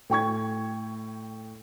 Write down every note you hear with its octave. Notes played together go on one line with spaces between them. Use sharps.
A2 G5 C#6 G#6